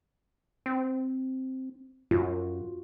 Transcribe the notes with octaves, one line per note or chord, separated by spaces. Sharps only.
C4
F#2 F4 F#4